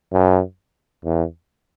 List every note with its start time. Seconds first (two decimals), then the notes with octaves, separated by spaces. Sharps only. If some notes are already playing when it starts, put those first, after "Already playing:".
0.13 F#2
1.05 E2